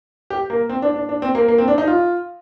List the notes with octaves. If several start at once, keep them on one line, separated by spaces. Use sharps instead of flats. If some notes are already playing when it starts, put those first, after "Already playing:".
G4
A#3
C4
D4
D4
D4
C4
A#3
A#3
C4
D4
D#4
F4